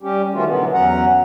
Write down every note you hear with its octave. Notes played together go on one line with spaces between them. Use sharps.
G3 C#4 G4
D#3 E3 A3 C#4 F4 F#4
B2 D3 E3 F#3 B3
E2 F#3 C#4 F#5 A#5